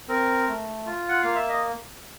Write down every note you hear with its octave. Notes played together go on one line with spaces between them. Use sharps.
C4 A#4
A3
F4
F#5
A#3 F5
E5
D#5